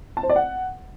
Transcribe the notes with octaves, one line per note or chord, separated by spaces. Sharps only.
A5
C5
D5
F#5